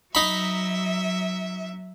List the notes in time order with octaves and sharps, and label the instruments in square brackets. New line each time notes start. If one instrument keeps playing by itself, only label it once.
[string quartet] F#3 E5 [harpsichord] D#4 B5